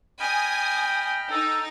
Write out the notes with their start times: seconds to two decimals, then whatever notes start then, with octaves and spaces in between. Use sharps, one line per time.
0.20 D#5 G5 G#5 B5 D#6 F6
1.31 D#4 A4